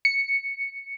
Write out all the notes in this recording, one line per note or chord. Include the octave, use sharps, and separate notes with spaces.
C#7